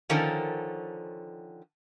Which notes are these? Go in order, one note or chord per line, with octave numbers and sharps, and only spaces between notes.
D3 D#3 F3 C#4 A4 A#4